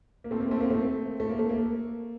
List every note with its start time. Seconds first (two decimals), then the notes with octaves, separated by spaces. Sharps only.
0.24 A#3
0.31 A3 C4
0.40 A#3
0.51 A3 C4
0.61 A#3
0.70 A3 C4
1.20 A3
1.29 A#3
1.39 A3
1.49 A#3